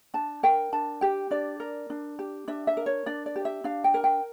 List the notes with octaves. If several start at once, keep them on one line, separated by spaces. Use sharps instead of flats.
D4 A5
A#4 G5
D4 A5
G4 G5
D4 D5
A#4
D4
G4
D4 E5
E5
A#4
C#5
D4 D5
D5
G4
E5
D4 F5
G5
A#4
G5